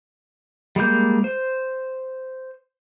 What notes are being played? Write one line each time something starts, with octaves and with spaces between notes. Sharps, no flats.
G3 G#3 A#3 G6
C5